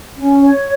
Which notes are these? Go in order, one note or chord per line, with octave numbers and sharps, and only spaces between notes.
C#4
C#5